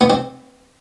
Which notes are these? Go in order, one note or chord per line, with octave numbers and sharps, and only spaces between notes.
B3
C4